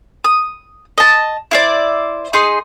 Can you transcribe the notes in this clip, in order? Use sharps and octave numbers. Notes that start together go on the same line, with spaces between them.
D#6
D#5 A5
E4 C5 D5
D#4 G#4 C6